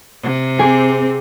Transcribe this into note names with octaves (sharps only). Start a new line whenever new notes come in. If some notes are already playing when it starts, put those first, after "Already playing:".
C3
C4 G#4 D6